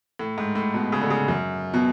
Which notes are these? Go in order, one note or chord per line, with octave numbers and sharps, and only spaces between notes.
A2
G#2
A2
B2
C#3
D3
C#3
F#2
B2